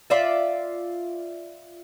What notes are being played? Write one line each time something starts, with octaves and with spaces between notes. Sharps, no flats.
F4 D5 E5